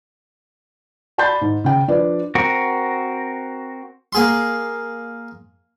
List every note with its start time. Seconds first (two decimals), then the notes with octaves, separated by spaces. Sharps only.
1.18 D5 A5 B5 C6 G6 A6
1.41 G#2
1.64 C#3 G5
1.88 F3 D4 B4 D5
2.35 C4 F#4 A#4
4.13 A#3 G#4 C6